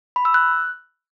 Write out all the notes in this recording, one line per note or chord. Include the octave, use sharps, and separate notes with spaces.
B5
E6
F#6